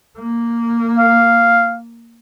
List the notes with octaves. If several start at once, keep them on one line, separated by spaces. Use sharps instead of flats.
A#3
F5